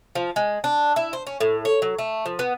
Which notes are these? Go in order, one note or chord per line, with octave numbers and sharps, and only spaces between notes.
F3
G#3
D4
E4
C5
C#4
A2
C#5
F#3
A3
F3
B3